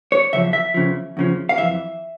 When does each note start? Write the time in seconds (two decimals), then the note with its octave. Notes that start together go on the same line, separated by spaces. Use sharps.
0.12 C#5
0.33 E2 C#3 F3 E5
0.53 E5
0.74 E2 C#3 F3
1.17 E2 C#3 F3
1.49 F5
1.58 F2 E3 E5